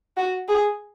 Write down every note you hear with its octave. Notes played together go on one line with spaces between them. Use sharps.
F#4
G#4